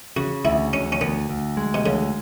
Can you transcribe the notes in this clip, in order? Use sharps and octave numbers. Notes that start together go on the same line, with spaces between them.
C#3 F#4
D2 E4
D2 C#4
C#4
D2 B3
D2
G#3
B2
D2 C#3